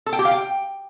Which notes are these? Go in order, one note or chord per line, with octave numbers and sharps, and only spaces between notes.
A4
G5
G4
F5
G5